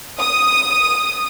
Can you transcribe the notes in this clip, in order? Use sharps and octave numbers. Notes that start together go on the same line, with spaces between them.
D#6